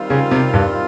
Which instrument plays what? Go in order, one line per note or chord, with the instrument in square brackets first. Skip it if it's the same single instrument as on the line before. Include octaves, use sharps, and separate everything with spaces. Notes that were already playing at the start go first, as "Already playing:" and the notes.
Already playing: [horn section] D#3 G3 C4 F4
[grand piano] C#3
C3
G2